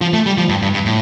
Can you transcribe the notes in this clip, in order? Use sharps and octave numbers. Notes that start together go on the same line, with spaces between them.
F3
A3
G3
F3
G2
G2
G2
A2